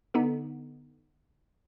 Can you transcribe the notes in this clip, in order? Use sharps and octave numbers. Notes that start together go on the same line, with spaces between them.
D3 B3 D#4